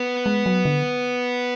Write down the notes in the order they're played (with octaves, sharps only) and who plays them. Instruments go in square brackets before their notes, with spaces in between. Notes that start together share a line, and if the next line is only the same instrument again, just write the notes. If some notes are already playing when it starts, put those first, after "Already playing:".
Already playing: [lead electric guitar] B3
[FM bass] G#3
F#3
D3